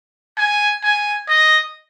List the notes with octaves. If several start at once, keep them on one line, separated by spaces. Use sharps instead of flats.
G#5
G#5
D#5